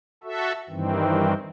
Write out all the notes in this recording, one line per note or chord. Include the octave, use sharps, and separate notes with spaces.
F#4 A4 E5
G2 D#3 E3 C4